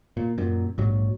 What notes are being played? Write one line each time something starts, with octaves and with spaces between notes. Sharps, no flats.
A#2
F#2 A#2
A#1 G#2 F#3